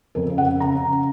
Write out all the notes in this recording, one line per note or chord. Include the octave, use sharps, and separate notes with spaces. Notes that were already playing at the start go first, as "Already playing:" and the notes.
F2 A#4
C#3
F#5
C#3
C#3 A#5
C#3